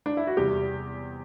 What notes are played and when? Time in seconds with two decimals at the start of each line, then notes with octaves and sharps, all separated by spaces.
0.06 D4
0.17 E4
0.27 F#4
0.37 E2 C3 G3 G4